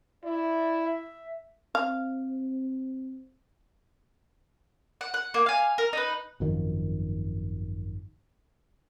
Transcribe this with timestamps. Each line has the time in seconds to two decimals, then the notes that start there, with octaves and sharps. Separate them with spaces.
0.24 E4 D5
0.86 E5
1.75 C4 F5
5.01 F#5
5.14 F#5
5.34 A#3
5.46 F5 G#5
5.78 A#4
5.93 D#4 B4
6.40 G#1 F#2 D#3 F3